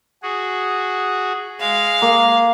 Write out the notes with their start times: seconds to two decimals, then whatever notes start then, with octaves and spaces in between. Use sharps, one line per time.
0.23 F#4 G#4
1.60 G#3 F5
2.02 A#3